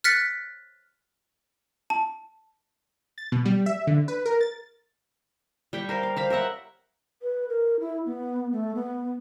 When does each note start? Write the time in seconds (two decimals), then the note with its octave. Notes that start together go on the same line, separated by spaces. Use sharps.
0.04 F6 F#6 A6 B6 C#7
1.90 A5
3.18 A6
3.32 B2
3.46 G3
3.66 E5
3.87 D3
4.08 B4
4.26 A#4
4.41 A6
5.73 G3 G5 B5 C#6
5.89 A#4 C5 F5
6.03 F5
6.16 C5 F5 B5
6.30 A#4 C#5 E5 F#5
7.22 B4
7.49 A#4
7.80 E4
8.06 B3
8.52 A3
8.75 B3